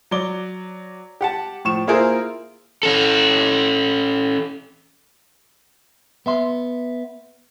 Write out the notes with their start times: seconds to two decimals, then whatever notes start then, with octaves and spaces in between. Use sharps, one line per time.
0.11 F#3 D5 D6 G7
1.21 G4 F#5 A5
1.65 A2 F3 C#6 E7
1.87 A#3 E4 F4 G#4 A#4 C5
2.83 C#4 A4
6.26 B3 E5 C6